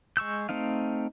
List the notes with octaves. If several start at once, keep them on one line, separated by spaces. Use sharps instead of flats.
G#3 C#6 E6 G6
A3 C4 D#4 F5